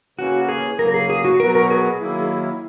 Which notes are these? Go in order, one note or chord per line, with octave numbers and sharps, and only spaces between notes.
C#3 E3 A#3 C#4 F#4
G#4
C#3 F#3 A#3 A#4
G#4
G#4
F#4
B2 F#3 B3 F#4 A#4
A#4
G#4
D#3 F#3 A#3 E4